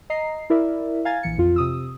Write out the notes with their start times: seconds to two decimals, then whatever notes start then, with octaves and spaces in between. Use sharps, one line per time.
0.10 D#5 A#5 C7
0.50 E4 A#4 D5 E5
1.05 F5 G#5 A#5 G#6 A6
1.23 A#1 E3 C#7
1.38 F2 F4
1.56 C3 D#6 E6